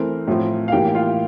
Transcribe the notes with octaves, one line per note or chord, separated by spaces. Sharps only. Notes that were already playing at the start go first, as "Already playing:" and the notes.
Already playing: E3 A3 C4 A#4
A2 F3 C4
F5
A2 E3 A#3 G4 G5
F4 F5